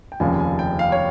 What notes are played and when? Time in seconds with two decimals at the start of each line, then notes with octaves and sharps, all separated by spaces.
0.12 G5
0.20 F1 D#2 C#3 F3 G#5
0.40 G#5
0.59 G5
0.79 F5
0.92 C#5